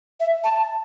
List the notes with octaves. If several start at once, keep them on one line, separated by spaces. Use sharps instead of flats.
E5
A5